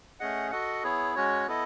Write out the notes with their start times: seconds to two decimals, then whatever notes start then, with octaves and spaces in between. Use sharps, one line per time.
0.20 A3 C#4 G#4 D#5 F#5
0.51 F#4 A4 D#5 F#5
0.83 B3 E4 G#4 C#5
1.15 G#3 C#4 F#4 C#5
1.47 B3 E4 A4 D#5